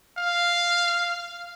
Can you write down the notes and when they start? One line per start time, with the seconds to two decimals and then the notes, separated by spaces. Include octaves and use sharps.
0.18 F5